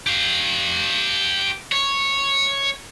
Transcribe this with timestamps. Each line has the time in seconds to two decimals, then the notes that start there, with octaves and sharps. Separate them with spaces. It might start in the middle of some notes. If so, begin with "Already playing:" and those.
0.07 G4 F5
1.72 C#5